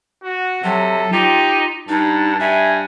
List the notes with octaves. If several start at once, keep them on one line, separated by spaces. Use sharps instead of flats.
F#4
C3 F#3 A4
D#4 F4 G4
G2 D#4 A5
G2 E5 G#5